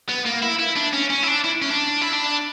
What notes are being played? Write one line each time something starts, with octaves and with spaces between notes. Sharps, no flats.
B3
A#3
E4
E4
D4
C#4
C#4
E4
D4
E4
C#4
D4
E4
D4